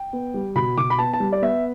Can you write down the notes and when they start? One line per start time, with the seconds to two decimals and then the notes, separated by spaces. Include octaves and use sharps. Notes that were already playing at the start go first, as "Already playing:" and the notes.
Already playing: G5
0.13 B3
0.34 G3
0.55 B2 B5
0.77 B2 D6
0.90 B5
0.99 B3 A5
1.14 A5
1.20 G3
1.32 D5
1.42 B3 E5